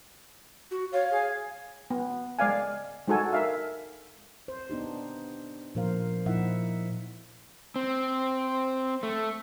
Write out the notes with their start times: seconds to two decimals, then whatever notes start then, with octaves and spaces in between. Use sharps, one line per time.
0.71 F#4
0.93 C#5 F5
1.11 G#4
1.90 B3
2.39 G#3 D5 F5 G#5
3.07 G#3 D#4 F#4 A4 G#5
3.33 A#4 E5 F5
4.48 C5
4.70 B3 D4 D#4 G4
5.75 A#2 F3 A#4 C5 F5
6.26 A#2 F3 D#4 E4 E5 F#5
7.76 C4
9.03 A3